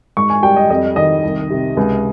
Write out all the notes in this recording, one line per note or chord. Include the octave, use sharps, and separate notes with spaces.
G#2 C#6
G#5
G3 G5
D#5
F2 D#5
D#3 D#5
C2
C3
C#2